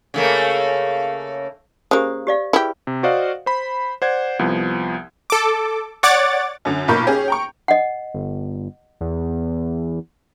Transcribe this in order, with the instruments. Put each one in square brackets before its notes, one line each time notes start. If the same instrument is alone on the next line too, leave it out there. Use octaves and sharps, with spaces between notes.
[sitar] C#3 A3 A#3
[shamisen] C#3 A#3 [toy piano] G4 C5 D#6
[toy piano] G4 D5 F5
[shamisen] E4 G4 [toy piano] G#4 B4
[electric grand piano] C3
F#4 C5 D5 D#5 F5 F#5
C5 B5
C5 D5 F#5 G#6
C2 F3 B3
[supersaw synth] A4 D6
C#5 D5 F#5 D6 A6
[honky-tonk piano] F#2 D3
B1 A#2 A#4 B5 C#6 G6
C#4 G4 G#4
G5 A#5 C#6
[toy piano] D#5 F#5
[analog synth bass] G1
E2